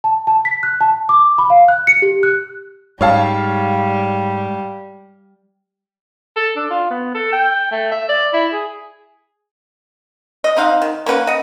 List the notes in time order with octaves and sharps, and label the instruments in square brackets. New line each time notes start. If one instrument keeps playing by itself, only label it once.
[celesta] A5
A5
B6
F#6
A5
D6
B5
F5
F#6
C#7
G4
F#6
[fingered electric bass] G#2 [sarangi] G3 [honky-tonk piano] C#5 F5 A5
[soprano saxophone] A4
D4
F4
B3
A4
G5
A3
E5
D5
E4
G#4
[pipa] D#5
C4 D#4 F5 F#5
D#3
A#3 C#4 B4 F#5
D#5 F#5